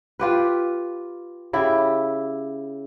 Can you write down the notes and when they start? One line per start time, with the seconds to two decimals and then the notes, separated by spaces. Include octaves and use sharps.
0.20 F4 G4 B4
1.53 C#3 E4 G4